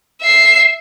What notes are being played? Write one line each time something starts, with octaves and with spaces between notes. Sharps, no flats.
E5 C7